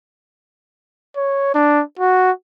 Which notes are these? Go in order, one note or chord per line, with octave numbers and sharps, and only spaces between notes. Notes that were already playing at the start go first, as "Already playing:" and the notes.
C#5
D4
F#4